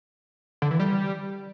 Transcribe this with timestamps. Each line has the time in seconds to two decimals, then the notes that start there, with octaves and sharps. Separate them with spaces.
0.62 D3
0.71 E3
0.79 G3